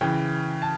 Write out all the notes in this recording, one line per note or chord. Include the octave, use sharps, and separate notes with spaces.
C#3 E3 G5
A5